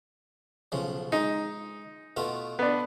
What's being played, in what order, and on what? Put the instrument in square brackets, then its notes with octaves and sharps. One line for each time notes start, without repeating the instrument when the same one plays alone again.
[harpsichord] B1 C#3 F3
[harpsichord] G#3 [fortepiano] D#4
[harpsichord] B2 A3 F4
[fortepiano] B3 D4